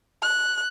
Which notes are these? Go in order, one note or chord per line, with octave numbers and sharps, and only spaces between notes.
F#6